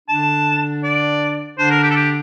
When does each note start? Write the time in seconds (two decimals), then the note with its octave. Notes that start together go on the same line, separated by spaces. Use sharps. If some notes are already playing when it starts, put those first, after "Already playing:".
0.09 D3 D4 A5
0.84 D5
1.58 D3 D4 C5
1.70 A#4
1.83 G4
1.90 A4
1.96 G4